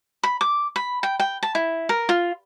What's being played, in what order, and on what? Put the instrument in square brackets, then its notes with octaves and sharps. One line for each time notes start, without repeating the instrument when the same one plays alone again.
[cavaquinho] B5
D6
B5
G5
G5
A5
E4
A#4
F4